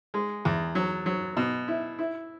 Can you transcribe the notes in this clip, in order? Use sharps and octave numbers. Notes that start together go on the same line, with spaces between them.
G#3
E2
F#3
F#3
B2
E4
E4